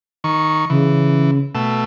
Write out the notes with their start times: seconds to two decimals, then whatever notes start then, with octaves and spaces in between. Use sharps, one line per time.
0.24 D#3 C#6
0.70 C#3 E3
1.55 B2 A3 E6